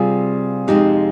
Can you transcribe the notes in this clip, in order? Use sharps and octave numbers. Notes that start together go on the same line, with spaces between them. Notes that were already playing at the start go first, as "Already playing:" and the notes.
Already playing: C3 G3 C4 F4 G#4
F2 C3 F3 G#3 C4 D#4 G4